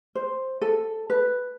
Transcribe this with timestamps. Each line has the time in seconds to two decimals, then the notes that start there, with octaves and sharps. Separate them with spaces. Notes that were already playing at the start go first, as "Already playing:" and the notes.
0.15 C5
0.61 A4
1.10 B4